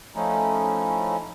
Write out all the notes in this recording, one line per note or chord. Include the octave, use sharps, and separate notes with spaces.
F3 A3 C#4 D#4 E4